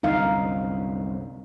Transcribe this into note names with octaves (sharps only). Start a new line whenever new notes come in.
C2 F#2 D3 D#4 F5